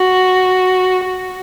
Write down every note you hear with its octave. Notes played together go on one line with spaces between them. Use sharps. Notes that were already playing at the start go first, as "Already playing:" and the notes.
Already playing: F#4
F#4